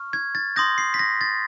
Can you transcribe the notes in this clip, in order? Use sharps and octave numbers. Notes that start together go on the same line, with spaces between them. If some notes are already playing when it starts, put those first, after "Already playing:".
Already playing: C#6 F6
G#6
A6
C6 D#6 G6 A#6
C7
B6
A#6
A6